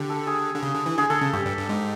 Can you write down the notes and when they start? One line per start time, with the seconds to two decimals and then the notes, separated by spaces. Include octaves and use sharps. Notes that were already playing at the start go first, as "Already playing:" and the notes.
Already playing: D3 G4
0.10 A4
0.27 G#4
0.55 D3
0.63 C#3
0.75 D3
0.86 E3
0.98 D3 G#4
1.10 D3 A4
1.21 C#3
1.33 G2 G4
1.46 G2
1.57 G2
1.69 G#2